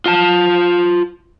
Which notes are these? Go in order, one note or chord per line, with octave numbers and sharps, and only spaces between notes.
F4 A5